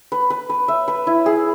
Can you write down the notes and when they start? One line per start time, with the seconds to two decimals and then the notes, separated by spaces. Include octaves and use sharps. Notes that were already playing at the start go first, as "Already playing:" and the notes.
0.12 B4
0.30 B4
0.50 B4
0.68 E5
0.88 B4
1.07 E4
1.26 G#4